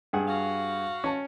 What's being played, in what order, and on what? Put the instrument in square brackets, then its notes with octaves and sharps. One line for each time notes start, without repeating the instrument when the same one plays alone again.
[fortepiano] G2 G#4 F#5
[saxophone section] F#4 F5
[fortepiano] C#4 A5